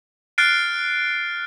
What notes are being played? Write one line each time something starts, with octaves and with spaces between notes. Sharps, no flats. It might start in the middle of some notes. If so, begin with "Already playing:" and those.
F6 F#6 A6 C7 D7